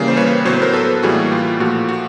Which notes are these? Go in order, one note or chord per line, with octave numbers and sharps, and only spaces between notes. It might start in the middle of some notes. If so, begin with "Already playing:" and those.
Already playing: C#3 E3 G3 A#3
C5
B4 C#5
A2 F#3 B3 C5
B4
A#4 C5
A4 B4
A2 E3 G3 A#3 F#4 G#4
F4 G4
A#2 F3 A3 F#4
F#4